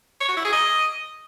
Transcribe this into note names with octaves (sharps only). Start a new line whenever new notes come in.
C#5
F#4
E4
G#4
D#5